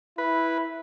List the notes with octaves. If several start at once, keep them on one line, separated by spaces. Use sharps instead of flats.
E4 B4